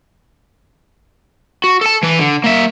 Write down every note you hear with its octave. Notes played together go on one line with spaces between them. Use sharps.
F#4
A4 A5
E3 B4
D3
A#3 E5